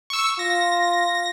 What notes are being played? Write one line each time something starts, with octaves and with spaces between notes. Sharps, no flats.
C#6 E6
F4 A#6